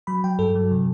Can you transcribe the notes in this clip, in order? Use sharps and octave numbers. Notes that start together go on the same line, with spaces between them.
F#3 B5
F#3 G5
G2 A4
F#3
C3